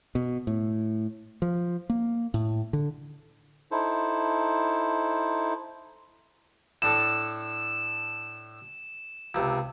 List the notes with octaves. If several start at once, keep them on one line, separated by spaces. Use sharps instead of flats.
B2
A2
F3
A#3
A2
D3
D#4 E4 A4 C5
A2 D4 A4 E7
C#2 C3